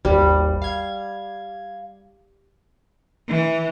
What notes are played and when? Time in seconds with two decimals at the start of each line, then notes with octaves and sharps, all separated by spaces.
0.05 G#1 D#2 G3
0.62 F5 G#6
3.28 E3